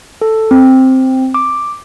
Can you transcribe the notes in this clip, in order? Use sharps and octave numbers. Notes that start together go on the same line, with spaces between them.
A4
C4
D6